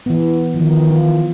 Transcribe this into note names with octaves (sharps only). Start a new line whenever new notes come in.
E3 B3
D#3 F3
F4